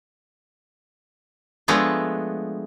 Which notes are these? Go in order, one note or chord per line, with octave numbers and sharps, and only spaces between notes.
F3 G#3 A3 B3 D4